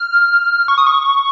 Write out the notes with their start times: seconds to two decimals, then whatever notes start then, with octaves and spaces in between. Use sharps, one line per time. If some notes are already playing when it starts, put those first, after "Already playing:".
Already playing: F6
0.68 C#6
0.78 D#6
0.87 C#6